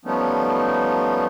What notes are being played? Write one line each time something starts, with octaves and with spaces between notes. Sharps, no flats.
F3 G3 A3 B3 C#4 D#4